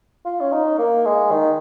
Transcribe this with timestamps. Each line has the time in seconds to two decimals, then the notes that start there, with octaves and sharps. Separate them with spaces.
0.25 F4
0.41 C#4
0.52 D#4
0.79 A#3
1.05 G#3
1.31 D#3